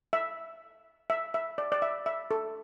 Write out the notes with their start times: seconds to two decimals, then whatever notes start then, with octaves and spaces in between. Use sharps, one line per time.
0.13 E5
1.10 E5
1.34 E5
1.58 D5
1.72 D5
1.82 E5
2.06 E5
2.31 A4